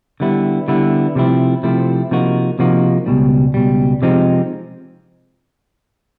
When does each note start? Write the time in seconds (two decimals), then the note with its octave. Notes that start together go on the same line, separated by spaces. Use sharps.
0.20 D3 G3 B3 E4
0.68 D3 G3 B3 E4
1.15 C3 F3 A3 C4 E4
1.63 C3 F3 A3 C4 E4
2.11 C3 F3 A#3 D#4 F#4
2.59 C3 F3 A#3 D#4 F#4
3.06 C#2 B2 G3
3.54 C#2 B2 G3
4.02 C3 F3 G#3 C4 D#4